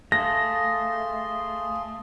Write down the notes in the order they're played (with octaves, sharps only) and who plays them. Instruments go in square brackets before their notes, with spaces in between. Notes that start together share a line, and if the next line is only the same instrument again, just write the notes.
[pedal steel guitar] A3 [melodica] G#4 C6 [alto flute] F5 [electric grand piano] A#6